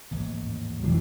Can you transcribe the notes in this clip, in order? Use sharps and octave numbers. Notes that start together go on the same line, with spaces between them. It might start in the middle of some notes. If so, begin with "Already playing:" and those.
A1 D#2 G#2
E1 F2 E3 F#3 A3 D4